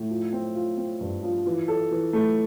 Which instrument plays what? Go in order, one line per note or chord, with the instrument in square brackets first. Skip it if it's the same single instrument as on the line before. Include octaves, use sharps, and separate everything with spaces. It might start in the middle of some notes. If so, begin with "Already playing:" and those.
Already playing: [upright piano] A2
F3
C4
F4
C4
G2
F3
E3
A4
E3
A3